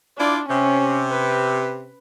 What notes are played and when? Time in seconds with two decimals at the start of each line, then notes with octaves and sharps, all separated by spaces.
0.18 D4 E4 F4 D5
0.48 C3 C#4
1.10 B4